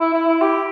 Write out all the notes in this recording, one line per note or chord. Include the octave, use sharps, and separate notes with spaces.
E4
E4
E4
G4